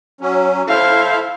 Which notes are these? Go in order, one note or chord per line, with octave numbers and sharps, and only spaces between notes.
F#3 C#4
E4 A4 C5 E5 F5